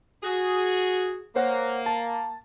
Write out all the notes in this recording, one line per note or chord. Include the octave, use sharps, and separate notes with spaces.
F#4 G#4
A#3 C5 C#5 F#5
A5